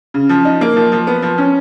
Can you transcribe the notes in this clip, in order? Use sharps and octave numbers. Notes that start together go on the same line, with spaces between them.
C#3
F3
D#4
A#3
F3
F3
B3
F3
C#4